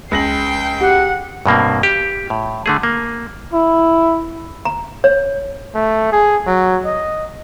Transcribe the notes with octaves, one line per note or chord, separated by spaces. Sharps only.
C#2 G5 A#6 C7 F#7
G4 F#5
G2 B2 A#3 C4
G4
A2
D3 A3 G#4
A#3
E4
A#5
C#5
A3
G#4
F#3
D#5